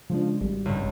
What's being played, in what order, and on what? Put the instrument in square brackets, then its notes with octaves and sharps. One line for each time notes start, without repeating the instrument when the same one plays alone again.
[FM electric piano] C#3 G#3 D4 [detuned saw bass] F3
[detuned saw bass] G#1 [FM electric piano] G3
[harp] C#2 G2